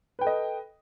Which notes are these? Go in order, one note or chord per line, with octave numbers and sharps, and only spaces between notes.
A4 B4 D#5 G5